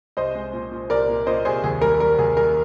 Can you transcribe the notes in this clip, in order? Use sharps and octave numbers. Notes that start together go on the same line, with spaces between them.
C2 C5 D#5
G#3
A#2
A#2
C2 A#4 D5
A#2
A#2 C5 D#5
C2 G#4 C5
D#2 G#4
G3 A#4
G3 A#4
D#2 G#4
G3 A#4